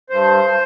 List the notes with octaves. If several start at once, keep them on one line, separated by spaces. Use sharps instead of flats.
G2 C5